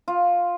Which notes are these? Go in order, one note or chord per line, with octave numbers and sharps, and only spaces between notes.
F4